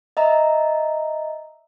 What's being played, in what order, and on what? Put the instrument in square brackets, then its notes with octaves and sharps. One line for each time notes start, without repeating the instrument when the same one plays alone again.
[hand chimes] D#5 E5 A#5